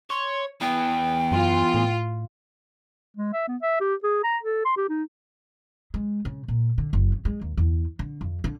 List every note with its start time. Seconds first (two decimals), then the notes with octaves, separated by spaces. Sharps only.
0.10 C#5 C6
0.61 E3 B3 G5
1.32 F#2 F4
1.74 A2
3.17 G#3
3.33 E5
3.48 B3
3.62 E5
3.80 G4
4.03 G#4
4.24 A#5
4.43 A4
4.65 C6
4.77 G4
4.89 D#4
5.94 G#3
6.25 C#3
6.48 A#2
6.78 D3
6.93 F#1
7.12 C#3
7.25 G#3
7.41 D#2
7.57 E2
7.99 D3
8.21 F2
8.44 D3